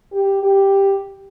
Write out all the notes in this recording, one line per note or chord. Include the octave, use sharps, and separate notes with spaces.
G4
G4